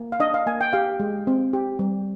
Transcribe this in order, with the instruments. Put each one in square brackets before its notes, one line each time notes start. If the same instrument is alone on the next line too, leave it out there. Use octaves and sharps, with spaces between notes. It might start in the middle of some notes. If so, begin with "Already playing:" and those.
Already playing: [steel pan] A#3
F5
D4 D#5
F5
A#3 G#5
G5
G4 F5
G#3
C4
G4
G3